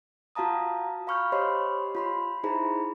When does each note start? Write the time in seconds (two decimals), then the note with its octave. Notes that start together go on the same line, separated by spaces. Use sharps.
0.35 F4 F#4 F5 A5 A#5 D#6
1.07 F5 B5 C#6 F6 G6
1.32 G4 C5 C#5 D#5 B5 C6
1.95 F4 B5 C6
2.44 D#4 E4 G#4 C5 A#5 B5